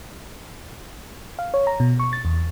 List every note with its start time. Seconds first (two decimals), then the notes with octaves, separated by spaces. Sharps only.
1.39 F5
1.54 C#5
1.67 A#5
1.80 B2
2.00 C#6
2.13 A6
2.25 E2